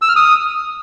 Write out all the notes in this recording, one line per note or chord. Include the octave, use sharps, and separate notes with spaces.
E6
F6
D#6